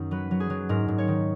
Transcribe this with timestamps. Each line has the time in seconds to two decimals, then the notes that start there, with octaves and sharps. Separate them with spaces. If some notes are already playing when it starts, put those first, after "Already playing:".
Already playing: F#2 D#3 C#4 D#4
0.11 F#3 B4
0.31 F#3
0.40 G#4
0.50 F#3
0.69 G#2 A#4
0.88 G#2
0.98 C#5
1.08 D#3